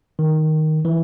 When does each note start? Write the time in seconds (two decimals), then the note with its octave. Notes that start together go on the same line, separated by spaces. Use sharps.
0.19 D#3
0.85 E3